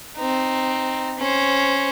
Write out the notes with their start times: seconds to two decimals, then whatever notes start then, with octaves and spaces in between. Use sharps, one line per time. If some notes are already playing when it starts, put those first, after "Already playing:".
0.17 C4 D#4
1.19 C#4 C5